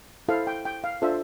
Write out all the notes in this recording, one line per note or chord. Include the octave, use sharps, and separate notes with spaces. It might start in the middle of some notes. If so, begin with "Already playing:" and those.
E4 A4 C5 F5
G5
G5
F5
D4 F4 A4 C5 E5